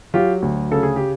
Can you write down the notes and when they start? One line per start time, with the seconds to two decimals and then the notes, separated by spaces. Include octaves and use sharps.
0.14 F#3 F4 G4
0.42 D2
0.71 C#3 A4
0.83 G#4
0.96 G4